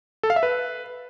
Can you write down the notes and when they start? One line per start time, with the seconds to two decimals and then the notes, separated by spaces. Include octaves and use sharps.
0.23 A4
0.30 F5
0.36 E5
0.43 B4